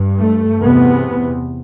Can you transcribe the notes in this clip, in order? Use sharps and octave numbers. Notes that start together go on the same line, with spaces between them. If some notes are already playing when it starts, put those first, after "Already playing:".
Already playing: G2
A3
E2 C3 B3